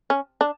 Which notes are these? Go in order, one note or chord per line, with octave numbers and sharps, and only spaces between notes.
C#4
D4